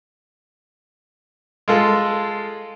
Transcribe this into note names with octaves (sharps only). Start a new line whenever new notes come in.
G#3 F4 A4